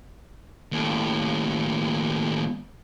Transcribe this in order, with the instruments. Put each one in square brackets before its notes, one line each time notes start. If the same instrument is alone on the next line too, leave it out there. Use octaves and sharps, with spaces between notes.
[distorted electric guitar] D#2 A2